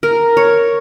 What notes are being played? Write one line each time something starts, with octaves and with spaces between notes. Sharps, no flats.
A#4
C#5